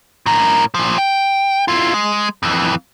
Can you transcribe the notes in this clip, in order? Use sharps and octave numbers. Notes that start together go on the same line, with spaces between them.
A2 A#4
A#2 F3
G5
E4 F4
G#3
F2 E3